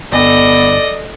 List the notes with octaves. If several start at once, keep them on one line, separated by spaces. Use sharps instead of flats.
G1 B3 A4 D5 D#5